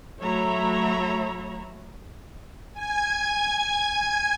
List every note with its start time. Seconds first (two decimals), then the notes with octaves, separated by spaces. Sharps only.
0.22 F#3 A3 C#5 E5 A#5 B5
2.73 G#5 G#6